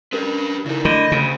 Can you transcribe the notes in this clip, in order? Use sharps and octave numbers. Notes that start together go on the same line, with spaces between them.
C#4 G4 A#4 B4
C#3 D#4 E4 A#4
D3 A3 D#5 B5 G6
D2 C#3